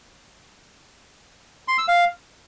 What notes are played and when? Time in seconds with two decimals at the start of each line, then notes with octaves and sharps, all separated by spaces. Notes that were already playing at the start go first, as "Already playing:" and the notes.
1.68 C6
1.78 E6
1.88 F5